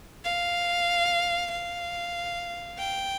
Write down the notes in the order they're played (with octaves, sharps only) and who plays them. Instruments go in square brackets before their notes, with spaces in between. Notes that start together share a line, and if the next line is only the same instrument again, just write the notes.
[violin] F5
F5
G5